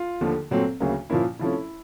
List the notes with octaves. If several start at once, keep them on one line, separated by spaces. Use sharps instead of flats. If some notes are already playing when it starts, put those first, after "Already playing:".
Already playing: F4
D#2 D3 F3 A3
A#2 F#3 A3 C4
D2 C#3 F#3 A#3
A#2 F3 A#3 C#4 E4
C3 F3 A3 C#4 E4